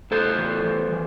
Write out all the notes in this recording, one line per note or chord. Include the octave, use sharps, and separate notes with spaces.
A2 A4 C5
E3
E3
E3